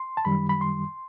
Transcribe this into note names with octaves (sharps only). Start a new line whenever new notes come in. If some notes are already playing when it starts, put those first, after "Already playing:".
Already playing: C6
A5
F#2 D#3 G3 B5
B5
C6